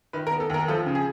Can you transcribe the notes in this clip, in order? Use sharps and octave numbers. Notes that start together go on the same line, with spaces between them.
D#3 B4
A#4
B3
A4
D#2 A#4
F3 A4
C#3
G#4